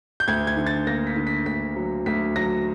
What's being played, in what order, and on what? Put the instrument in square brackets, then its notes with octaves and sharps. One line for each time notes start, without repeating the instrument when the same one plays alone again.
[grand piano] G6
D2 G#6
G#6
D3
A6
A#3 A#6
B6
D3
B6
D2 B6
F#3
D2 B6
F#3 A#6